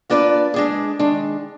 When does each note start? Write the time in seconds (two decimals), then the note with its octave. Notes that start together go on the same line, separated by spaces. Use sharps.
0.10 A#3 D4 F4 B4 D5
0.54 G#3 D4 G#4
0.99 D#3 G#3 D4